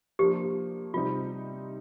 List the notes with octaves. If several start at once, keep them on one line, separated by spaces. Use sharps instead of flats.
F3 A#3 D4 G4
C3 G3 C4 D#4 F4